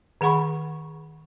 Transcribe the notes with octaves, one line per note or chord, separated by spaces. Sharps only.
D#3 G#4 F#5 B5 C#6